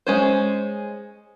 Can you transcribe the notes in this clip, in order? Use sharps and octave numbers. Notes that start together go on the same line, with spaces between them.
G#3 C#4 C5